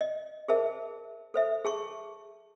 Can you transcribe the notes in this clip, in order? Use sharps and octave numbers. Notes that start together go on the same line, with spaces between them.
D#5
G#4 A#4 C5 E5 A5
A4 C5 E5
G#4 A5 C#6